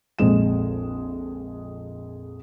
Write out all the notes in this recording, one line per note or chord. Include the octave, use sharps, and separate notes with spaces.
A#1 F2 G#3 E7